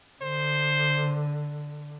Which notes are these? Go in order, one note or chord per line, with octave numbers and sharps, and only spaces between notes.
D3 C5